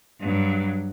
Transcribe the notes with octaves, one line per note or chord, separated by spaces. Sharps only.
G2 F#3